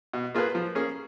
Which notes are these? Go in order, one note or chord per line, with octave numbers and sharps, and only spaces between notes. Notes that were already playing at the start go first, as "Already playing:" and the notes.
B2
A#3 F4 G#4 B4
F3
A#3 C#4 G#4